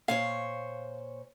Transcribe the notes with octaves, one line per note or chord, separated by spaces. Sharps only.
A#2 C5 C#5 F5